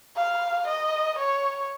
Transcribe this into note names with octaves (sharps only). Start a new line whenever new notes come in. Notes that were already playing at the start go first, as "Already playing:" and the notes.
F5
D#5
C#5